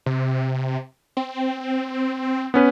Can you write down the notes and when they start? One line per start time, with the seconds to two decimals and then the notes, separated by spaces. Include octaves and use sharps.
0.06 C3
1.17 C4
2.54 B3 C#4 B4